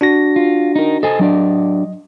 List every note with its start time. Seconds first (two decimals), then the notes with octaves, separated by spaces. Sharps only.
0.01 D4 F#4 A#6
0.36 F4
0.76 D#4 A#4
1.03 A4 C5 D#5 G#5
1.19 F#3 D4 D5